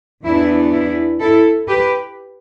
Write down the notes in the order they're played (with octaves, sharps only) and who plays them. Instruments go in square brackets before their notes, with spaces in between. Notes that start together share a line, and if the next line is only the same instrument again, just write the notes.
[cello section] E2 E3 B3 D4 E4
E4
E4 A4
G4 B4